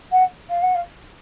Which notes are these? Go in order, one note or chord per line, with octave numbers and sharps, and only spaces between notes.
F#5
F5
F#5
F5